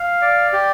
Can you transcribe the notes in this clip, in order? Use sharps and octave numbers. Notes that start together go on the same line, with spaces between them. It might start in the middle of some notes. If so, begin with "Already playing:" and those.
Already playing: F5
D5
G4